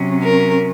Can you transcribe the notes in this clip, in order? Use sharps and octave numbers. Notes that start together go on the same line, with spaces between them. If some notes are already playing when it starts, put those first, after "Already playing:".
Already playing: C3 F#3 C#4
A#4